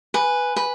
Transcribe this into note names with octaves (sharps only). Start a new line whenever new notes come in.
B4 G#5
B4